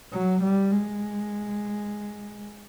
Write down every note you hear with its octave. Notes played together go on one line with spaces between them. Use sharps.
F#3
G3
G#3